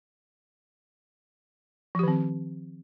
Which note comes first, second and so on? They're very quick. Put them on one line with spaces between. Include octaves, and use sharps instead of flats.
F3 G4 D#3 C4